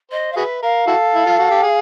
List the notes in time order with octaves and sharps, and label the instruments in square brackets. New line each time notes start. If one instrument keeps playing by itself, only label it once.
[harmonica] C5 [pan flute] D#5
[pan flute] F5
[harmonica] F#4 G#4 B4 [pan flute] E5
[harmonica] A#4 [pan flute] F5
[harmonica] E4 F#4 A4
E4
F4
F#4
G4
G#4